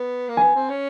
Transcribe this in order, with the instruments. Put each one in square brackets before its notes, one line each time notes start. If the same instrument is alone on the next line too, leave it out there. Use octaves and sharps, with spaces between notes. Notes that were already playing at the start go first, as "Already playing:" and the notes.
Already playing: [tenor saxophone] B3
A#3
[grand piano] G#5
[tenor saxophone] B3
C4
C#4